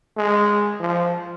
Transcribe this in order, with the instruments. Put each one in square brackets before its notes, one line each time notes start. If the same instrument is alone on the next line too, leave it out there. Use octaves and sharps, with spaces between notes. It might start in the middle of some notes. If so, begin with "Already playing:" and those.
[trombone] G#3
F3